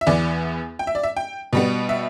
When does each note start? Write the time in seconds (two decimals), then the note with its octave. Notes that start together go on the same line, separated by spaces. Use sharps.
0.01 E5
0.07 E2 E3 B3 D5
0.79 G5
0.87 E5
0.95 D5
1.03 E5
1.17 G5
1.53 B2 G3 B3
1.89 E5